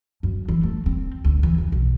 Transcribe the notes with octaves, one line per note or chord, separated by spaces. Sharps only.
F#2
E3
A3
C4
D2
E3
F2
B1